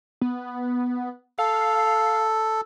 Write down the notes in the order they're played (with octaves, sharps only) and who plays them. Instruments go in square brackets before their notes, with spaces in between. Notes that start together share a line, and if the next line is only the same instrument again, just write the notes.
[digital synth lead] B3
[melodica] A4 [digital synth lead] F5